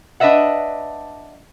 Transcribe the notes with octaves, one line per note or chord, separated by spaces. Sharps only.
D4 B4 D#5 E5 F#5